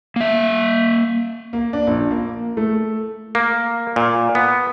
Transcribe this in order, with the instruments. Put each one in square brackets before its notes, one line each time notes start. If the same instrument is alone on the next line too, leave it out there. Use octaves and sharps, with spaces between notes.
[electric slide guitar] A#3 E5
[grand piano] A#3
D4
A#1
A#3
A3
[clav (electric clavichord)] A#3
A#2
B3